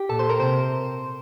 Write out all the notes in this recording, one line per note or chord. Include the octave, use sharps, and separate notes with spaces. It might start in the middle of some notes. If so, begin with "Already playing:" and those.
Already playing: G4 G5
A#2 A4 A5
C5 C6
A#4 A#5
C3 C5 C6